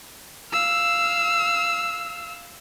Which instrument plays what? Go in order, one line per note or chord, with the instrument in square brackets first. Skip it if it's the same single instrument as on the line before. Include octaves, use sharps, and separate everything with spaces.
[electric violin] F5 E6